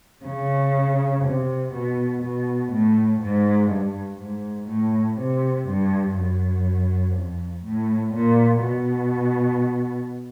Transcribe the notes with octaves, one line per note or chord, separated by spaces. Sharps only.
C#3
C3
B2
B2
A2
G#2
G2
G#2
A2
C3
G2
F#2
F2
A2
A#2
B2